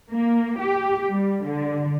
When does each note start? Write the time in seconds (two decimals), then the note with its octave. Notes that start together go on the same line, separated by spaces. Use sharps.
0.11 A#3
0.60 G4
1.09 G3
1.44 D3